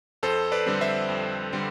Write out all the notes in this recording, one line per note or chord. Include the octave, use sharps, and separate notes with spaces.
F2 A4 C5
B4 D5
D3 G3 C4
C5 E5
F2
D3 G3 C4